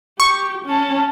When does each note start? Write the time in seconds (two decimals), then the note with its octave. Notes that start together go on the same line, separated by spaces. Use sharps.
0.20 G4 C#6
0.65 C#4 A5